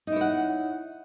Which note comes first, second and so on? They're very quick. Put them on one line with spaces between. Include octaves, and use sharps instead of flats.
D#4 E4 C#5 F#5